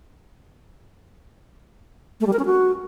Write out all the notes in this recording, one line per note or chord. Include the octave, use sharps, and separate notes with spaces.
A3
G3
A#4
C#4
F#4